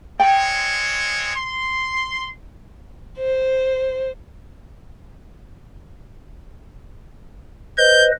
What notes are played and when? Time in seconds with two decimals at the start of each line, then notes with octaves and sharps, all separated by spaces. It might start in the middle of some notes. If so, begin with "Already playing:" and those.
0.20 G#3 C4 C#5 G5
1.34 C6
3.18 C5
7.78 B4 C5 D#5 G6